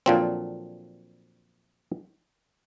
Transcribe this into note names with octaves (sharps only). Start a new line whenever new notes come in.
A#2 D3 F3 F#3 C4